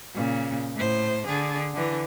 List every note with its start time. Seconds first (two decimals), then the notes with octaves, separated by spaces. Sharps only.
0.15 A#2 C#3
0.76 A2 C5
1.27 D3 G#4
1.74 D3 E3